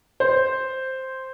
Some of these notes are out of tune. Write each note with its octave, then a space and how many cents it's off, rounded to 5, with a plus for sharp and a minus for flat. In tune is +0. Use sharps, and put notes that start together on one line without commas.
C5 +0